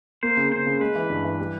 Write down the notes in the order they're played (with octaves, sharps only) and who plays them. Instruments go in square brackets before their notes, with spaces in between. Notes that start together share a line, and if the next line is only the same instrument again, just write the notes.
[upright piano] A#3 [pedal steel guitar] C5
[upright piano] C#3
[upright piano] C#3 [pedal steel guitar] C5
[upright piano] C#3
[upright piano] G#3 [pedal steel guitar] B4
[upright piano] E3
G2
E3
G3